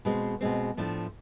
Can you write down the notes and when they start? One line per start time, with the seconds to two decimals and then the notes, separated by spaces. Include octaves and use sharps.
0.05 B2 G#3 C4
0.41 B2 G#3 C4
0.77 A2 F3 A3 D4